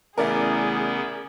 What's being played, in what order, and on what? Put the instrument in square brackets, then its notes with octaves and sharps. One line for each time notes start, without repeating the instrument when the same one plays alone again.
[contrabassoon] A1 [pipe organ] C#3 B3 E4 [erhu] G#4 [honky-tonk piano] A#4 D5 E5